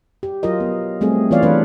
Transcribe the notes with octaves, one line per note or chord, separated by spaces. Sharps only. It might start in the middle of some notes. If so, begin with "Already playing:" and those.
G4
F#3 F4 A#4 D#5
B3
G3 A3 C4 G#4
E3 B3 F4 C#5 D5 F5
E3 A3 D4 E4 B4